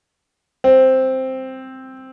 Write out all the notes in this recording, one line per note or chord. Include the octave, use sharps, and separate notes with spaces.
C4